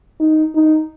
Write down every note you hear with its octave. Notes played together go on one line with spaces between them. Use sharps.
D#4
D#4